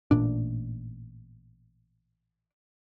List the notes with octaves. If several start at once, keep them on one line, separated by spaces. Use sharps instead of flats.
A1 A#2 D4